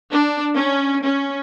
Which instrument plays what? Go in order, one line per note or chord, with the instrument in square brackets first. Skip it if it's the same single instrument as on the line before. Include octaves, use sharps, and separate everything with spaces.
[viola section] D4
C#4
C#4